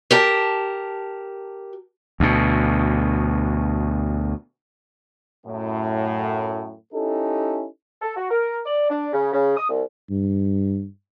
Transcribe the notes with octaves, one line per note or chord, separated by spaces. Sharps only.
G4 A#4 A5
D2 B2
F#2 A2
C#4 D#4 E4 G4 A4
A4
F#4
A#4
D5
D4
C#3
C#3
D#6
C2
G2